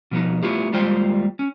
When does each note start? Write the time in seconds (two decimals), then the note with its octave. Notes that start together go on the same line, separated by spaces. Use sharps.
0.11 B2 F3 B3 D#4
0.43 A3 B3 E4 F4 G4
0.72 D#2 G3 G#3 F4 C5 G5
1.39 C#4